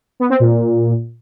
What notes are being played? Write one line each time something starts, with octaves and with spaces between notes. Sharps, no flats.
B3
C4
A#2